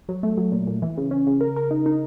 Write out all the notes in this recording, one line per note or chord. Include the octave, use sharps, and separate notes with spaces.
F#3
A3
F#3
A#2
A#2
E3
C#3
C#4
C#3
A#4
A#4
D#4
D#4